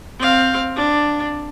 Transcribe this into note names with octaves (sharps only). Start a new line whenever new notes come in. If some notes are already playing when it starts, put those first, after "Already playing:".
C4 F5
D4